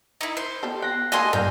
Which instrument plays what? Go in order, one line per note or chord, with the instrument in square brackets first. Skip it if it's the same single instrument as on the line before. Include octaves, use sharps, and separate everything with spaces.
[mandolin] D#4 E4
C5
[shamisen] B3 G4 A4
[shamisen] G5 [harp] F#6 A#6 C7
[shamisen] A3 A#3 A4 [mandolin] D#5 G#5 C6
[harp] G2 [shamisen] A#3 A#4 [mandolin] G6